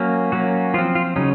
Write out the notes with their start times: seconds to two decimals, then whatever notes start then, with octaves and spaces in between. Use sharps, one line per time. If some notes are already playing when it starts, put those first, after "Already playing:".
Already playing: F#3 A#3 C#4
0.32 F#3 A#3 C#4 F#4
0.74 F3 F4
0.78 C4
0.95 F4
1.16 C#3 F#3 C#4 D#4